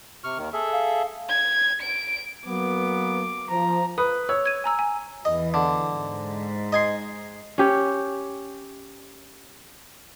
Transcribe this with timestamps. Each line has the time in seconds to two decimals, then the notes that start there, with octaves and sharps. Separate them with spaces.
0.24 C3 C#6 F6
0.38 D#2 D#3
0.53 G#4 A4 E5
0.72 F5
1.29 G#6
1.82 D7
2.47 F#3 A#3 B3 D6
3.50 F3 A#5
3.98 B4 D#6
4.29 C#5 E6
4.46 G#6 D#7
4.64 G#5 A#5 E6
4.79 G#5
5.25 E2 E3 D#5
5.54 D3
5.91 G#2
6.73 D#5 G#5 C6
7.58 C#4 G4 C#5